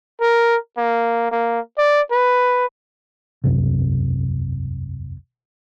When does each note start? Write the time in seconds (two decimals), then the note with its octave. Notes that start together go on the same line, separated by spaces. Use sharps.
0.21 A#4
0.78 A#3
1.32 A#3
1.78 D5
2.12 B4
3.44 E1 C2 F#2 C3